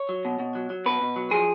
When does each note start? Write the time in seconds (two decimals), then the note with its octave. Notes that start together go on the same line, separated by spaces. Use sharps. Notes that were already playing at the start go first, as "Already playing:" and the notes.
Already playing: C#5
0.09 F#3
0.25 B2
0.39 B2
0.55 F#3
0.70 F#3
0.86 B2 B4
1.01 B2
1.16 F#3
1.31 F3 G#4